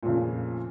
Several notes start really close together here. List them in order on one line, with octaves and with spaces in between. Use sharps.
A#2 F2 C#3